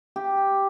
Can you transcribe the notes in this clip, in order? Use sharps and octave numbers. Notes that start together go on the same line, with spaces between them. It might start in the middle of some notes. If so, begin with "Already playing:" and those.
G4